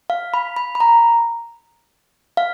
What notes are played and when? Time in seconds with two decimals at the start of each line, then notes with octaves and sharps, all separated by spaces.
0.10 F5
0.34 B5
0.56 B5
0.75 B5
0.80 A#5
2.37 F5